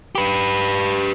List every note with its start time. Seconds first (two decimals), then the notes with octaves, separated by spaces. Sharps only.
0.15 G4 B4